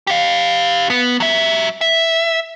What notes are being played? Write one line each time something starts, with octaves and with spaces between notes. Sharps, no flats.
G4 F5
B3
F#3 E5
E5